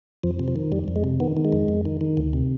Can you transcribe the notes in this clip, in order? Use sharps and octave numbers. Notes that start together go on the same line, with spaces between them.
F2 F3
C3
F3
D#3
F2 G3
F2
G#3
C3
D#3 B3
D#3
G#3
F2
F2
D#3
D#3
D2
C3